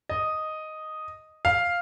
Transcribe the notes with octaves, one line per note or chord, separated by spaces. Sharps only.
D#5
F5